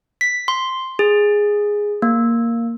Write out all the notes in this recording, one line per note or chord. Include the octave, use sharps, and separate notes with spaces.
B6
C6
G#4
A#3